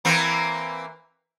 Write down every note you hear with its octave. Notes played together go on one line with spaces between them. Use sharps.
E3 A#3 C4